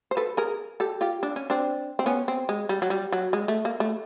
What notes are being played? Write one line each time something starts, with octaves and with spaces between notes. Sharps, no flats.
C5
A4 B4
G#4 A#4
G4 A4
F4 G4
D4
C#4
C4 D4
C4
B3 C#4
C4
G#3
G3
F#3
G3
F#3
G#3
A3
A#3
A3